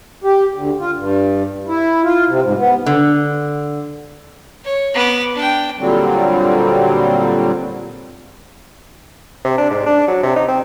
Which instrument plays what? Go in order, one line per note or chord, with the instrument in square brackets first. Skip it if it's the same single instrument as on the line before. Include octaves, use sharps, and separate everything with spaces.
[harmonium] G4
D2
F4
G2
E4
F4
C3
G#2
B3
[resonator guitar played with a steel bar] D3
[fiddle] C#5
B3 D6
D4 G5
[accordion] A#2 D3 F#3 G3 C4
[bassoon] C3
D4
G#2
D4
F#3
C3
D#4
C4